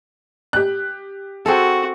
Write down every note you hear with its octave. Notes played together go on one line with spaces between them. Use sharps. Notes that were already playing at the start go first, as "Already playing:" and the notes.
G4 F#6
C4 F#4 G#4 A4